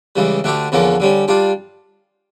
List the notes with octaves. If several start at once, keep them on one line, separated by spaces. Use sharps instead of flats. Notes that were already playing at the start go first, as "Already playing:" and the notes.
C#2 C#3 E3 G3
D2 D3 A3 D4 G4
E2 D3 F3 A#3 C#4
D3 G3 C#4
G3 D4 F4